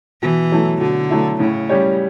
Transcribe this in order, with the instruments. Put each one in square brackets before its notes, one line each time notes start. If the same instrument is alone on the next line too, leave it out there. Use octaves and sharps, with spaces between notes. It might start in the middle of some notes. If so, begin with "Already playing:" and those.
[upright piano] B2 [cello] E3
[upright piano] F#3 A3 E4
[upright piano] B2 [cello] D3
[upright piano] F#3 A3 E4
[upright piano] A2 [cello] C#3
[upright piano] G3 C#4 G4 C#5